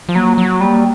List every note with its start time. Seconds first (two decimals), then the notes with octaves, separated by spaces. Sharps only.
0.09 F3
0.15 F#3 A#3
0.38 F#3
0.60 G3 A#3